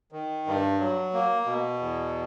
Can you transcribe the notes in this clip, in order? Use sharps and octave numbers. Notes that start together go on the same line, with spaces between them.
D#3
G2
F#3
A#3
B2
E2